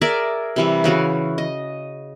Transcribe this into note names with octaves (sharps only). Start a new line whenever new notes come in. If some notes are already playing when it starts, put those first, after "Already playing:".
G#4 A#4 D5 E5
C3 E3 G3
C#3 E3 F#4 F5
D#5